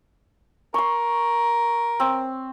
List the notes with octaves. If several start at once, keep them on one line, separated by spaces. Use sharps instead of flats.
A#4 C6 C#6
C4